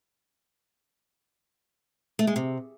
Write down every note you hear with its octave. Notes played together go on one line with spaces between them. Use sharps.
A3
G#3
C3